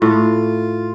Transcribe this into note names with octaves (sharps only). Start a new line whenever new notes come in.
A2 F4